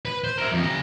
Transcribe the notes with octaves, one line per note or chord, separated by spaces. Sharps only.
B4
C5
A#4 E5
F2
C#3 A#5